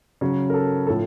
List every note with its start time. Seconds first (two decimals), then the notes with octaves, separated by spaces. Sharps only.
0.21 C#3 F#3
0.50 A#4
0.54 A4
0.87 A2 F3 A4